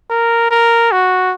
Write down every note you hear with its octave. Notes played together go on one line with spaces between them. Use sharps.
A#4
A#4
F#4